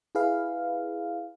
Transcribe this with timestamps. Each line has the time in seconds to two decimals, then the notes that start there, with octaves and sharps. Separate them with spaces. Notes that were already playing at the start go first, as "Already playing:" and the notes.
0.15 E4 G#4 B4 F5